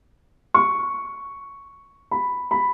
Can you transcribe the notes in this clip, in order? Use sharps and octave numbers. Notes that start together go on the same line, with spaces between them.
C#6
B5
B5